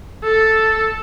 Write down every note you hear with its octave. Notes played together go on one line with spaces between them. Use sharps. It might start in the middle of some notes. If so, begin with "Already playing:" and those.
A4